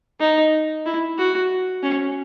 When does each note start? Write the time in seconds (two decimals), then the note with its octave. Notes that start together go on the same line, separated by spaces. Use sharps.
0.20 D#4
0.86 E4
1.18 F#4
1.83 C#4